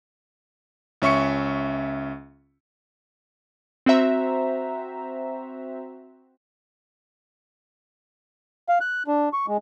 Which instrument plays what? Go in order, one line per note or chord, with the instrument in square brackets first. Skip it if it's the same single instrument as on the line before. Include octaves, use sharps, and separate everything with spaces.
[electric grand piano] C#2 C#4 E5 C#6 C#7
[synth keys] C4 F#4 C5 E5 A#5
[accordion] F5
F#6
D4
C#6
G#3